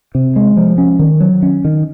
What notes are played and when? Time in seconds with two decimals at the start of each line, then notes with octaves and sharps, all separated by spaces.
0.15 C3
0.36 G#3
0.57 F3
0.78 C#4
0.99 D#3
1.21 F#3
1.42 C#4
1.65 D#3